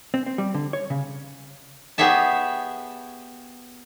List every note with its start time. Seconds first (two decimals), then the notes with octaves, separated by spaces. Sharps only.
0.14 C4
0.26 C4
0.38 G3
0.54 D3
0.73 C#5
0.90 C#3
1.98 B3 G4 G#4 C#5 E5 A5